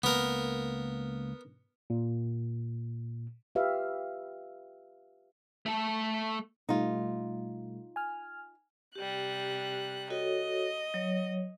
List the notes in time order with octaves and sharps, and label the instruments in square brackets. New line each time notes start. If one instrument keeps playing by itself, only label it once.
[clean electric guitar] C#2 A#3 [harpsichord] B3 A#4
[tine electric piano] A#2
[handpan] F4 G4 B4 E5 F5
[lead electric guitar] A3 A4
[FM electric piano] B2 G3 A3 [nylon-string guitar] D#4 F4
[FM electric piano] G#5 F6
[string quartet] C3 G3 F#6 [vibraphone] G4
[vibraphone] F#4 A4 C#5 [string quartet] D#5
[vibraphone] F#3 C#5